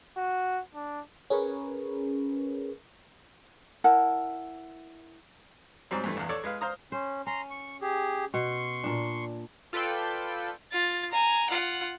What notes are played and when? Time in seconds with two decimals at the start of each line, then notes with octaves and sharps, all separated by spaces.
0.17 F#4
0.75 D4
1.30 C#4 G#4 A#4 B4 C#5
3.84 E4 A#4 F#5 A5
5.91 G#2 F#3 G3 C4
6.04 G2 E3 A3
6.17 A#1 E2
6.29 A4 C#5 D5
6.44 G#3 B4 F5
6.61 C5 F5 A#5 D#6
6.92 C#4 C5
7.27 C#4 A#5 C6
7.51 C#6
7.81 G4 G#4
8.34 B2 C6 C#6
8.84 A#2 D4
9.73 F4 A4 B4 D5 G5
10.72 F4 A6
11.11 G#5 A#5
11.50 F4 F#5